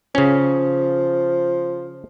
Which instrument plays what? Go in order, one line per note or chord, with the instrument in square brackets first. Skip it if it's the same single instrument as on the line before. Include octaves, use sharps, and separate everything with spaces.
[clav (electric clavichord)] C#3 C#4 [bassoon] F3